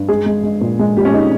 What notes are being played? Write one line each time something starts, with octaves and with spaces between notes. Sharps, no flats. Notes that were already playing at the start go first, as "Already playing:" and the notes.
Already playing: G2
G#3 G#4
G#3
G#3
A#2
G#3
A#2 G4
C#4
G#3 D#4